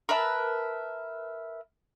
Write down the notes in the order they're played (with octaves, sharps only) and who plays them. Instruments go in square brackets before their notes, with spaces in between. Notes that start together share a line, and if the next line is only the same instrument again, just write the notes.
[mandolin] A#4 B4 E5 A5